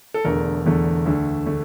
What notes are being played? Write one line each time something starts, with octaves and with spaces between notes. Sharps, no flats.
A4
E1 E2 D3 A3 A#4
E1 E2 D3 A3
D2 D3 A3
D3 A3